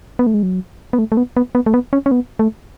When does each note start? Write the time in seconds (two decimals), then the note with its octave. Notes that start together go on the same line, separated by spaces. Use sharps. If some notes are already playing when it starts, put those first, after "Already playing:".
0.19 B3
0.27 A3
0.34 G#3
0.43 F#3
0.93 B3
0.99 A3
1.12 A3
1.17 B3
1.37 B3
1.55 B3
1.66 A3
1.74 B3
1.93 C#4
2.06 C#4
2.11 B3
2.39 A3